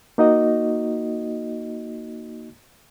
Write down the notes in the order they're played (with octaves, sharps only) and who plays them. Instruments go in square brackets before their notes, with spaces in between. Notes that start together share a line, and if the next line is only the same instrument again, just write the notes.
[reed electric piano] A#3 D#4 F#4 D#5